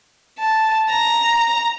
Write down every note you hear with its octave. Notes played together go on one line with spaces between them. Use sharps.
A5
A#5